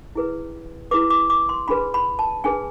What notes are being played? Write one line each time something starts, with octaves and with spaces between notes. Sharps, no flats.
E4 G#4 B4
E4 G#4 B4 D6
D6
D6
C6
D4 G#4 B4 B5
B5
A5
D4 G#4 B4 G#5